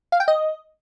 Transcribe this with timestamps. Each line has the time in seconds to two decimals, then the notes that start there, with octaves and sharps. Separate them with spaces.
0.12 F5
0.20 G5
0.28 D#5